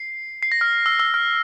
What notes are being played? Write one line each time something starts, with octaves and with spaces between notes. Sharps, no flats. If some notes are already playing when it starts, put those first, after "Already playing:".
Already playing: C7
C7
A#6
F6
E6
E6
F6